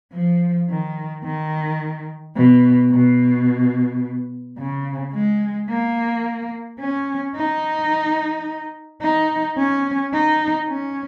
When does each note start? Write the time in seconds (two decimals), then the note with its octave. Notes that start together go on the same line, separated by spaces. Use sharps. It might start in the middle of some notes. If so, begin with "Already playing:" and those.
0.13 F3
0.70 D#3
1.24 D#3
2.36 B2
2.91 B2
4.59 C#3
5.14 G#3
5.70 A#3
6.80 C#4
7.36 D#4
9.02 D#4
9.58 C#4
10.13 D#4
10.69 C#4